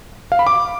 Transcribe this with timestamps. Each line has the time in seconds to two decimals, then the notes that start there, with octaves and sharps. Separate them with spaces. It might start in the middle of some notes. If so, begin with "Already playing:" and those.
0.32 F5
0.39 B5
0.47 D6